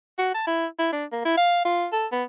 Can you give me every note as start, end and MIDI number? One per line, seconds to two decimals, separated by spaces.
0.18 0.31 66
0.34 0.45 81
0.47 0.66 64
0.79 0.91 64
0.92 1.05 62
1.12 1.22 58
1.25 1.36 64
1.37 1.65 77
1.65 1.87 65
1.92 2.06 69
2.12 2.24 59